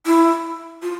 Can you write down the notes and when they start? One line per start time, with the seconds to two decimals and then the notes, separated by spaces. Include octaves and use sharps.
0.06 E4
0.83 F4